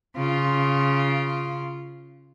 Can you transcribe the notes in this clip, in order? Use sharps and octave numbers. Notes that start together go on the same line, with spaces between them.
C#3 F4